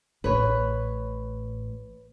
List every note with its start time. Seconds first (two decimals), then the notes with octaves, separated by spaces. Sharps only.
0.24 A1 A2 B4 C#5